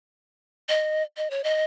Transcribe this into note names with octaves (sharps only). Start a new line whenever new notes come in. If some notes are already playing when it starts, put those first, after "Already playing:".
D#5
D#5
C#5
D#5